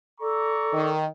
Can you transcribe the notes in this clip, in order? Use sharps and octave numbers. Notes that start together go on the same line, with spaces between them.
A4 D5 A#5 C#6
D#3